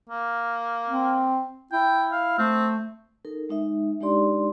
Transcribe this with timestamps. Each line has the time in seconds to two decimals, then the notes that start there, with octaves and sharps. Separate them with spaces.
0.10 A#3
0.88 C4
1.72 E4 G5
2.12 F5
2.39 A3 C4
3.25 D#4 A4 A#4
3.49 G#3 D#4 E5
4.01 G#3 D4 D#4 G4 D5 C6